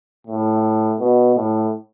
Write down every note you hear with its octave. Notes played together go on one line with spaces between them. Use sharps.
A2
B2
A2